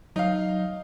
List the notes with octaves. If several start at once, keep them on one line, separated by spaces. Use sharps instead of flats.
F#3 D#4 F5